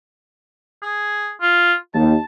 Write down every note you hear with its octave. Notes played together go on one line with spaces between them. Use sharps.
G#4
F4
D#2 A5